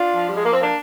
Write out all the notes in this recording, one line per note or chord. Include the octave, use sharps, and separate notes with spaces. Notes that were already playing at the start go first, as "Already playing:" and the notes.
Already playing: D4 F4
F3
G3
G#3
A#3
C4
A#3 D4